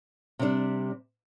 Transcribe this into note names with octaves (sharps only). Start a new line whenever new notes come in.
C3 G3 D4